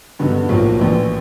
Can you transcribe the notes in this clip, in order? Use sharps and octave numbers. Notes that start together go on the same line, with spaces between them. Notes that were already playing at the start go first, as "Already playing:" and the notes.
G2 D3 F#3 B3 D#4
B1 A2 F3 A#3
A#1 A2 E3